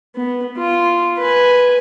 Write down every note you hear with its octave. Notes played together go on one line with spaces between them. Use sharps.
B3
F4
B4 G#5